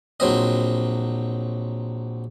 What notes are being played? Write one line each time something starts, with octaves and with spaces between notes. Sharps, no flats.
A#1 F#3 C4 D#5